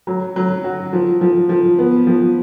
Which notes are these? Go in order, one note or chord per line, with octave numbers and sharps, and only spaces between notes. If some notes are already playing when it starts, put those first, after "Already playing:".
F#3
F#3
F#4
F3
F3
F3
B3
F3